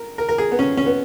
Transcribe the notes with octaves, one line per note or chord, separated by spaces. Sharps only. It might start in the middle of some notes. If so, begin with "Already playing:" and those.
Already playing: A#4
A#4
A#4
G#4
B3
C#4
C#4
B3